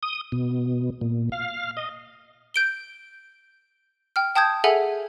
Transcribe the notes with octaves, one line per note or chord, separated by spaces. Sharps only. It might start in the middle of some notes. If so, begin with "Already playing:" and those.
D#6
B2
A#2
F5
D#5
G6 D7 G7
G5 F6
G5 A5 D#6 G6 G#6
G#4 A4 E5 F#5 G#5